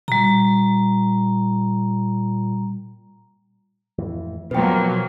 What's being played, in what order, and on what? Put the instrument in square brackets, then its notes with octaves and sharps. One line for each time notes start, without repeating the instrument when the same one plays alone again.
[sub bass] A#2 [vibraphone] G3 A#5
[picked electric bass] F2 A2 E3
[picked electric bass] B2 [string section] F3 F#3 A#3 [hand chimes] B4 G5